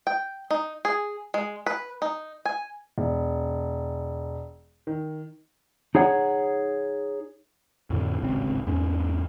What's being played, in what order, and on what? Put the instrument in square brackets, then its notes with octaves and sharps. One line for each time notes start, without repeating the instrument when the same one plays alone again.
[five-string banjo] G5
D#4
G#4
G#3
B4
D#4
G#5
[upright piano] E1
D#3
[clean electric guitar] D#4 G#4 C#5 F#5
[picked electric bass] F2 A2 D3
D1 G#1 C#3 C4
E2 G#2 C#4